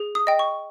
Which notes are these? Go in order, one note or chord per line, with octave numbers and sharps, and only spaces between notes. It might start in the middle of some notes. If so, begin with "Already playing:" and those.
Already playing: G#4
D#6
D#5 G5
C#6